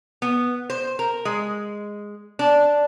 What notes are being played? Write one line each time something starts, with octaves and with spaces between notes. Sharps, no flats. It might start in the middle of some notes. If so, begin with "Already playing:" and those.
B3
C5
A#4
G#3
D4